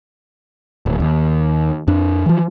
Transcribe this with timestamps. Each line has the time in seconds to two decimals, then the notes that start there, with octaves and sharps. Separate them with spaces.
0.86 D1
1.00 D#2
1.88 F2 D4
2.26 E3 F3